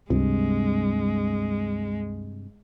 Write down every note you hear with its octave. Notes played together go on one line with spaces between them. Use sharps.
C#2 G2 C3 G#3